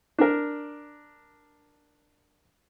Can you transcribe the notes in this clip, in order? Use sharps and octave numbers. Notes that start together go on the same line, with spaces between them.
D4 A#4